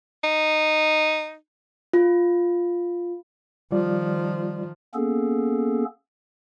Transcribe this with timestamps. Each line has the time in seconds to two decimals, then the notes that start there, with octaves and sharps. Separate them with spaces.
0.24 D#4
1.93 F4
3.72 D#3 F3 G3 F4 D5
4.94 A#3 B3 C#4 G#4 A4